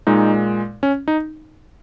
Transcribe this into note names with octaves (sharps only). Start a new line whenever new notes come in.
A#2 G#3 D#4
C#4
D#4